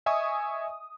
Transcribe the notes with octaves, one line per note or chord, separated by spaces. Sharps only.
D#5 E5 G#5 C#6 D#6